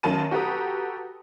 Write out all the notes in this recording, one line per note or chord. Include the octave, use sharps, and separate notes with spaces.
F#2 D#3 F#3 A#3 A5 D#7
F#4 G4 A4 B4 A#5 D#6